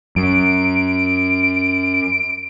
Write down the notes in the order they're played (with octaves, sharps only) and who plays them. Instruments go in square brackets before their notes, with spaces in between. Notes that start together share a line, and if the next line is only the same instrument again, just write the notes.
[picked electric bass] F#2 [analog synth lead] D7